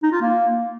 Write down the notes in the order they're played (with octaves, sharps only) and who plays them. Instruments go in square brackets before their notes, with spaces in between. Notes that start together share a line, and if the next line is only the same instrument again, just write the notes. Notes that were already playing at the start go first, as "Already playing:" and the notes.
[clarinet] D#4
F4
A#3